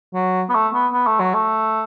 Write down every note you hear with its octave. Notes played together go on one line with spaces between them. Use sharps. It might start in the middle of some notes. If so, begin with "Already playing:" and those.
F#3
B3
A3
B3
B3
A3
F#3
A3